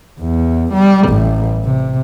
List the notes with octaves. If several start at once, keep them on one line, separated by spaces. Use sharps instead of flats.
E2
G3
A1
C3